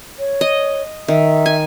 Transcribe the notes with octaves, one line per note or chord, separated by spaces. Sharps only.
C#5
D#5
D#3 E5
G#5